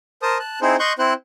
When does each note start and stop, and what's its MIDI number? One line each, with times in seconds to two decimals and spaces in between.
0.22 0.38 70
0.22 0.38 72
0.22 0.38 81
0.22 0.38 87
0.39 0.60 81
0.39 0.60 90
0.61 0.76 60
0.61 0.76 63
0.61 0.76 64
0.61 0.76 68
0.61 0.76 72
0.80 0.93 75
0.80 0.93 84
0.80 0.93 85
0.80 0.93 90
0.80 0.93 91
0.99 1.13 60
0.99 1.13 64
0.99 1.13 72
0.99 1.13 90